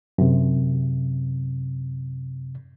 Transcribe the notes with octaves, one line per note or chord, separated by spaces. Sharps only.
F#2 C3